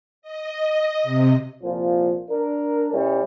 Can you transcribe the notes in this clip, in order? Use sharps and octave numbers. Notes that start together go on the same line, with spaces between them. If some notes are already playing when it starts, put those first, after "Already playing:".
D#5
C3
C2 A#2 F3
D4 A#4
B2 G3 C#4 E4